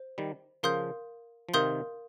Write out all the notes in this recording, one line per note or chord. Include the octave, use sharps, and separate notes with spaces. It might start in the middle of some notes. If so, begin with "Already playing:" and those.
Already playing: C5
D#3 G3
C#3 F3 A#4 F5 C6 D#6 G6
F3
C3 D#3 A#4 F5 C6 D#6 G6